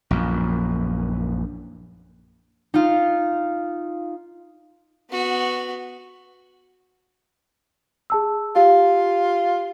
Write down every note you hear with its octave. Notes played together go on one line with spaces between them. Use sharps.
A#1 F#2
D#4 F4
B3 F#4
G#4 A5 E6
F4 G4 F5